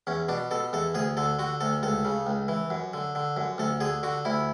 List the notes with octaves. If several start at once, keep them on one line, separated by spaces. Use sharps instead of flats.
E2 C#4
B2 D4
B2 A4
E2 A4
D2 G#4
D3 A4
D3 F#4
D2 A4
C#2 A4
C#3
C#2
E3
F#2
D3
D3
F#2
D2 A4
D3 G#4
D3 F#4
D2 E4